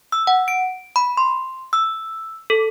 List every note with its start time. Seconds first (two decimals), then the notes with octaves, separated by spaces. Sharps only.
0.12 E6
0.27 F#5
0.48 D7
0.96 B5
1.17 C6
1.73 E6
2.50 A4